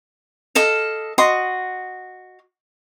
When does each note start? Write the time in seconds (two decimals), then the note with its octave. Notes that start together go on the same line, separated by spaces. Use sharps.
0.55 A4 D#5 F5
1.18 F#4 D#5 C6